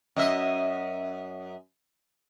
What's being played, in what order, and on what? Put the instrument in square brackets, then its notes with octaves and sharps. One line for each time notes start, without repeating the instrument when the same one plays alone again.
[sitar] F#2 D#5 E5